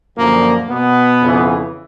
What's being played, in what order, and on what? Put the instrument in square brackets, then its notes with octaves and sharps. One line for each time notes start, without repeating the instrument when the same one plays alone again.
[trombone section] F#2 A#2 D3 F3 A#3
B2 B3
F2 C#3 E3